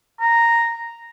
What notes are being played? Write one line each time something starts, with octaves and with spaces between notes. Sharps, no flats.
A#5